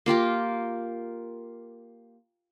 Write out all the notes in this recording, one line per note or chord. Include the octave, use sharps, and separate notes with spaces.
A#3 F4 G4 A#4